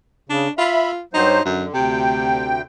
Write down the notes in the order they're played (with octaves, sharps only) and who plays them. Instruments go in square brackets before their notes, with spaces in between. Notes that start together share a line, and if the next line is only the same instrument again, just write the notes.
[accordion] C#3 [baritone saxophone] D4
[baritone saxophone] F4 [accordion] E5 B5
[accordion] G2 F#3 C5 [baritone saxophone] D#4
[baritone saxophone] F#2 [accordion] D3
[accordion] D2 G5 [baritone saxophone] C3